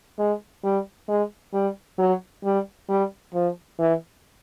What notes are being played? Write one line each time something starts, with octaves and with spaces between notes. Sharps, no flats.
G#3
G3
G#3
G3
F#3
G3
G3
F3
E3